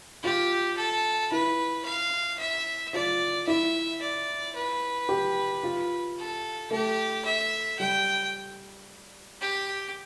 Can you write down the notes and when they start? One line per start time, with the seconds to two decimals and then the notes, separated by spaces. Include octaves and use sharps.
0.23 F4 G4
0.77 A4
1.32 E4 B4
1.85 F5
2.39 E5
2.93 F4 D5
3.47 E4 E5
4.01 D5
4.55 B4
5.09 G4
5.63 F4
6.18 A4
6.71 A3 G4
7.25 E5
7.79 G3 G5
9.41 G4